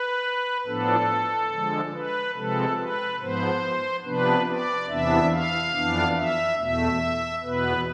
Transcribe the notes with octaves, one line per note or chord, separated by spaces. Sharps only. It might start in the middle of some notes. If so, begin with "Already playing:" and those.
Already playing: B4
A2 F3 B3 D4 A4
D3 F3 G#3
B4
C3 F3 G#3 C4 A4
B4
G#2 F3 B3 C5
C3 F3 B3 D4 B4
D5
E2 C3 E3 B3 D4 E5
F5
F2 E3 B3 D4
E5
E2 B2 A3 E5
E2 B2 B3 B4